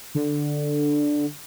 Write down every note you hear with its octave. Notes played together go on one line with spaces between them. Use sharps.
D3